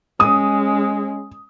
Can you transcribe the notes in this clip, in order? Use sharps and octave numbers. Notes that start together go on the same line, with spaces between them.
G#3 C#4 D#6